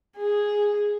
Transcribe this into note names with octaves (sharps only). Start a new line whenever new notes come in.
G#4